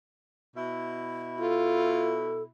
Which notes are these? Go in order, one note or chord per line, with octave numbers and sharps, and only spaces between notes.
B2 E4
F4 A4